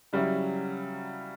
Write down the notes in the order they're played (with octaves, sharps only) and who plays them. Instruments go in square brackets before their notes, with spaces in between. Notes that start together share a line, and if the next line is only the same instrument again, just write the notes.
[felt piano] C#3 F#3 C#4 E4 [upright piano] G3